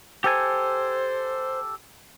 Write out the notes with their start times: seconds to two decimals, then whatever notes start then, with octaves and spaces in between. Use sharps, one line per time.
0.24 G4 A4 C5 G#5